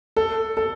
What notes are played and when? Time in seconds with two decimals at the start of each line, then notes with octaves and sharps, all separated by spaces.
0.16 A4
0.57 A4